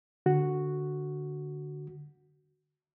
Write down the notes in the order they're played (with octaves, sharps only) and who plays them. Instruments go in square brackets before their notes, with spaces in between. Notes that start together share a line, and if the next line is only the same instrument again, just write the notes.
[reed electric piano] D3 F#4